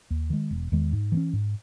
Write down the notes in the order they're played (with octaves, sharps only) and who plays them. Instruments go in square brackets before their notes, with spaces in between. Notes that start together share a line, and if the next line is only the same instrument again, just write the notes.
[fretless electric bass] D#2
D#3 G#3
E1
E2 D#3 G#3
G#2
E3 A#3
C#4
G#2